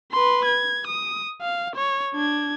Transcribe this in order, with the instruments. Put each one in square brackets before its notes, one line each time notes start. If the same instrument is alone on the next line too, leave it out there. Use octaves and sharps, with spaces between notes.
[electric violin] B4 C6
G#6
D#6
F5
C#5
D4 G#6